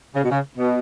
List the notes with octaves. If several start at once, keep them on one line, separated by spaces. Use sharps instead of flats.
C#3
B2
C#3
B2